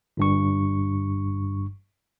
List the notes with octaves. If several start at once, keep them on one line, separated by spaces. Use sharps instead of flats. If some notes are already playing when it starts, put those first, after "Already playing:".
G1 G2 C#6